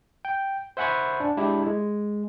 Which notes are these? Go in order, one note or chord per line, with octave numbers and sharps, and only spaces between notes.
G5
C5 E5 F#5 G#5 B5 C#6
D4
G#3 D4 E4 G4
G#3